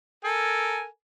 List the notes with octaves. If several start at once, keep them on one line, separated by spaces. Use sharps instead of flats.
A4 A#4 G#5